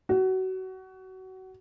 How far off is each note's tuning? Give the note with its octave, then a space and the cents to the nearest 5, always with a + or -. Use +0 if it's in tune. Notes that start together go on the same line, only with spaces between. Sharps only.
F#4 +25